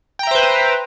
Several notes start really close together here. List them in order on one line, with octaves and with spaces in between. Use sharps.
G5 A#5 E5 C5 B4